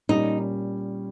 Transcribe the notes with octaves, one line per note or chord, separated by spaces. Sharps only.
A#2 G3 C#4 D#4